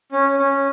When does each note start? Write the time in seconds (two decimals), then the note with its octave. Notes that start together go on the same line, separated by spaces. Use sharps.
0.12 C#4
0.39 C#4